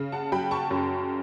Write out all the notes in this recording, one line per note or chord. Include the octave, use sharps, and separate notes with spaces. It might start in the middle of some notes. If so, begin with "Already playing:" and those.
Already playing: C#3
F#5 A5
F#3 G5 B5
A5 C#6
F#2